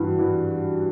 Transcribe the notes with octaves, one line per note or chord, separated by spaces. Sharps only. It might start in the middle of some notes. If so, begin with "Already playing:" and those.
Already playing: G2 E3 F#4
E3